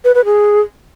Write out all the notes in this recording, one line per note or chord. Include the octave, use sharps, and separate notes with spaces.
B4
B4
G#4